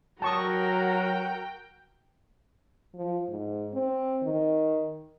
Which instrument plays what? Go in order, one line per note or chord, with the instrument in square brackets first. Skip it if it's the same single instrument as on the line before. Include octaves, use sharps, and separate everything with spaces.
[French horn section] F#3 [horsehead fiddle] F#4 A#4 [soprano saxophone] G5 [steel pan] A5 C#6 D#6
[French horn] F3
G#2
C4
D#3